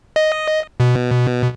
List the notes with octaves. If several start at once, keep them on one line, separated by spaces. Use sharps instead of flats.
D#5
B2